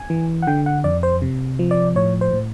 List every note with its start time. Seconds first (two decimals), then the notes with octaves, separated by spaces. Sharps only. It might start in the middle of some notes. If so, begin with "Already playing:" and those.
Already playing: G#5
0.10 E3
0.42 F#5
0.47 D3 G5
0.66 F#5
0.84 F2 D5
1.03 C5
1.22 C3
1.59 F3
1.71 D5
1.95 A2 C#5
2.21 C5
2.33 A2